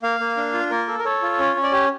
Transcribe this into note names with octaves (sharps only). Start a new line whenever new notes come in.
A#3 F5
A#3
D4
F4
A#3 A#4
A4
A#4
A4 C#5
F4
C#4
C#4
D5
G4 C#5